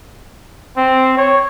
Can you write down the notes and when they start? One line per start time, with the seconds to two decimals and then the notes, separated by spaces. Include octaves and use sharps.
0.77 C4
1.17 C#5